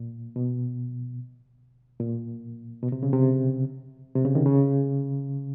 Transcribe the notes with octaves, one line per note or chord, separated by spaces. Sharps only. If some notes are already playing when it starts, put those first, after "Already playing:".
Already playing: A#2
B2
A#2
B2
C3
C#3
C3
C3
C#3
D#3
C#3